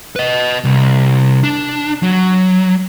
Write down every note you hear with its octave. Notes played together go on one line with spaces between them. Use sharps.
B4 D#5
C2
D4
F#3